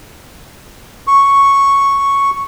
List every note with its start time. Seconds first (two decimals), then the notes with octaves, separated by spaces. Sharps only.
1.07 C#6